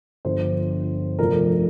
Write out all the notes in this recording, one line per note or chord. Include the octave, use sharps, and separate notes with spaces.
G1 G2 F3 C5
F1 F2 F3 A#4